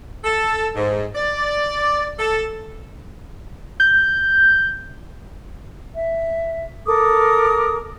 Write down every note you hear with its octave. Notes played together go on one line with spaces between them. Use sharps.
A4
G#2
D5
A4
G6
E5
A4 A#4 D6 D#6